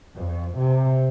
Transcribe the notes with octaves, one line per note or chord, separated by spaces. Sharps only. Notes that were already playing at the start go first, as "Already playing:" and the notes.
F2
C3